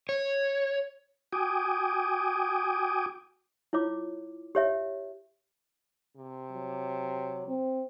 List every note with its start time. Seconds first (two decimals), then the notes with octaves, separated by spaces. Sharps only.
0.09 C#5
1.32 F#4 G5 G#5 D6 D#6
3.73 E4 F4 C#5 D6
4.55 G4 C#5 E5
6.16 C3
6.52 F#3
7.48 C4